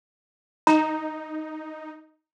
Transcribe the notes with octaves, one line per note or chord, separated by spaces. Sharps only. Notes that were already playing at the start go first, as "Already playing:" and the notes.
D#4 A#5